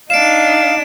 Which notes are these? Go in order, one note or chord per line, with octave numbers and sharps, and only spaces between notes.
D4 D#4 F5 D7 E7